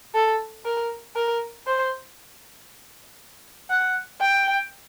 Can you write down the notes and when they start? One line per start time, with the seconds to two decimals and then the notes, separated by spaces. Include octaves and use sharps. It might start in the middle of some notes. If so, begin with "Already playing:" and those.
0.15 A4
0.65 A#4
1.16 A#4
1.67 C5
3.70 F#5
4.21 G5